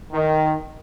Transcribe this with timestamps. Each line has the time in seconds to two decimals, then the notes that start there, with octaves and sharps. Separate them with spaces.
0.12 D#3